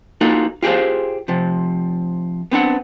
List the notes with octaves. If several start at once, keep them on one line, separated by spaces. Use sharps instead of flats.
A#3 D#4 F4 F#4 A4
F4 G4 G#4 C5 F5
C3 F3
B3 C4 D4 F#5